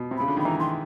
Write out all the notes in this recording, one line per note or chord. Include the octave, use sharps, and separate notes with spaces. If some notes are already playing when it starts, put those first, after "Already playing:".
Already playing: B2
C3
C#3 B5
D3
D#3 B5
E3 A#5
D#3 C6